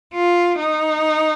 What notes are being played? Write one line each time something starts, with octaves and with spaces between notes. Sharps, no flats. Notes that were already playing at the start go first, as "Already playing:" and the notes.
F4
D#4